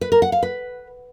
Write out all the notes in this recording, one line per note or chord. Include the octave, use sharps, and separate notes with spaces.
B4
A#4
F#5
F5
B4